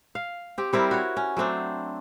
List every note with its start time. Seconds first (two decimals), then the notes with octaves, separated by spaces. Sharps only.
0.15 F5
0.58 C4 G4
0.73 G3 C4 E4 A#4
0.91 F#4 C#5
1.17 C#4
1.37 F#3 A3 C4 D4